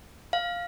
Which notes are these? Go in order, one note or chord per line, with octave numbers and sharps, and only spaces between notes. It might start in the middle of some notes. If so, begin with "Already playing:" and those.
F5